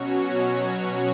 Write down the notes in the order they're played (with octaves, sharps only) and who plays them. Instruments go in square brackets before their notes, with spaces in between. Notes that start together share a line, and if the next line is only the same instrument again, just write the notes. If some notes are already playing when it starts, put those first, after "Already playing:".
Already playing: [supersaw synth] B2 F#3 C#4 F#4 C#5